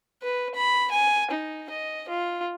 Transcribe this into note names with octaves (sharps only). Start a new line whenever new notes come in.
B4
B5
G#5
D#4
D#5
F4